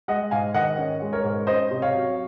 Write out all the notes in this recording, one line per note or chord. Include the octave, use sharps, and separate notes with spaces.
G#3 D#5 F#5
G#2 F5 G#5
D#3 D#5 F#5
C#4
G#3
A#4 C#5
G#2
C#4 C5 D#5
C3
C#5 F5
F#3